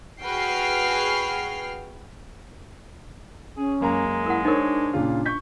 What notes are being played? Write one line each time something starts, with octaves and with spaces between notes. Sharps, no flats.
F#4 G#4 B4 G5 F6 C7
C#4 G#4
F#2 G#3 A#3 A#5
E4 A#4 F#5
D4 D#4 A#4 C5 C#5
A#2 C#3 F4
C#6 G6 B6